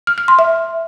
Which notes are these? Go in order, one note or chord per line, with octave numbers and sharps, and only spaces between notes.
F6
F6
C6
E5